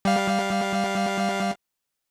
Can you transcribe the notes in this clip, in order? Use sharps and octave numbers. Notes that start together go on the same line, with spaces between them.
G3 F5